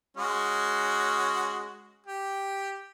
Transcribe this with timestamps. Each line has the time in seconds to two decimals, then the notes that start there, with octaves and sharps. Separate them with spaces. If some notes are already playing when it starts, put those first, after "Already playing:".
0.17 G#3 C#4 F#4
2.06 G4